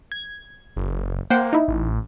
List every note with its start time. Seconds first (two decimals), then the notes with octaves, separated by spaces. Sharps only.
0.12 G#6
0.77 F#1
1.30 A#3 C5 F#5 G5
1.53 D#4 E4
1.68 A1